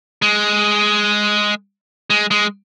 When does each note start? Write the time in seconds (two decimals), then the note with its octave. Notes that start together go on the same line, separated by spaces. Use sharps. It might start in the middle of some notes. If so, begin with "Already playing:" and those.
0.22 G#3
2.10 G#3
2.31 G#3